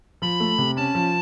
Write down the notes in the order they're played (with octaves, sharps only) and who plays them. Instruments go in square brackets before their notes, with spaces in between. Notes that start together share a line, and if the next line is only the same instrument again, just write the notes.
[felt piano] F3 [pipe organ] B5
[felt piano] A3
C3
[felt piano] C#4 [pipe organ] A5
[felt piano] F3